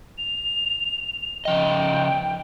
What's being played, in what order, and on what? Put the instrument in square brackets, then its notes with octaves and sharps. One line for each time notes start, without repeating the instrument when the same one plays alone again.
[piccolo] F7
[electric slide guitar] C#3 F3 D#5 [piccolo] G5